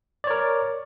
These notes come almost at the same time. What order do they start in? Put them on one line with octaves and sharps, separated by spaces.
D5 C#5 A#4